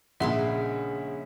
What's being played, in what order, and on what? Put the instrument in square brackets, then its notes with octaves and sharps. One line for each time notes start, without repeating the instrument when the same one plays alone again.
[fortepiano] A#1 A#2 [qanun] C#3 G#3 C6 [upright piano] E5 F#5 B6